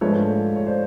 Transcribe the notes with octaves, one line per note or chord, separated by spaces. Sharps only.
G#2 F3 A3 D4 F4 B4 C#5
C#5
C5 D5